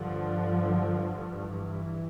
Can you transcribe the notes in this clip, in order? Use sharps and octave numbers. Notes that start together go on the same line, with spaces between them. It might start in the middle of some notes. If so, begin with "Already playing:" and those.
Already playing: G2 D3 F3
E3